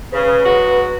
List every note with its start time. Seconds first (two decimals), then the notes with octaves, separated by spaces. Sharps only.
0.13 C#3 B4
0.44 F#3 G#3 F#4